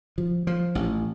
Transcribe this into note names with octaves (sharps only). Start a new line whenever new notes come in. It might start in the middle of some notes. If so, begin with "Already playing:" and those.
F3
F3
A1